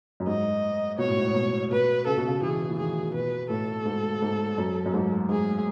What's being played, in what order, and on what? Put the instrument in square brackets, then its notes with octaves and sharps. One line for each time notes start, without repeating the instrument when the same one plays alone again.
[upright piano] F#2
[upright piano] G#2 [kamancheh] D#5
[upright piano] B2 [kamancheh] C#5
[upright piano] A2
G#2
A2
B2
[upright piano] B2 [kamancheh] B4
[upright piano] C#3 [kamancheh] A4
[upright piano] B2
C#3
[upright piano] E3 [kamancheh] G#4
[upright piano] E3
[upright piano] D#3 [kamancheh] G#4
[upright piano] B2 [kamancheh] B4
[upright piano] A2 [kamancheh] A4
[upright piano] G#2
G#2
F#2
F#2
G#2
[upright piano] G#2 [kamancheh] G#4